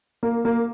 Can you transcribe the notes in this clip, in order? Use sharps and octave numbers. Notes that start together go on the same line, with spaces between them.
A#3
A#3